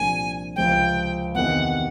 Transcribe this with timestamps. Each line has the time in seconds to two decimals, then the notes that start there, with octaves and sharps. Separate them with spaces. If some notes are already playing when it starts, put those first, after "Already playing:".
Already playing: C2 A#2 F3 A#3 D4 G#5
0.56 C#2 C3 F3 G#3 C4 G5
1.35 E2 C3 D#3 F#5